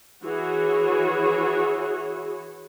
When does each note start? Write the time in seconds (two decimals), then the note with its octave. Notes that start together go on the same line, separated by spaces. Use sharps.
0.23 E3 F#4 G#4 C#5